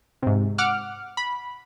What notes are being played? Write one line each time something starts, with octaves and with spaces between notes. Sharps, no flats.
G#2 C3
F#5 D6 F6
B5